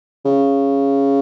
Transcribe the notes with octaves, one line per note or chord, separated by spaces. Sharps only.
C#3